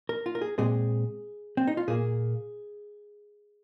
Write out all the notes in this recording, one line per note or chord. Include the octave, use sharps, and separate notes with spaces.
A#4
F4
A#4
G#4
A#2 G#3 C4 G#4
C4
D#4
F4
A#2 A#3 G#4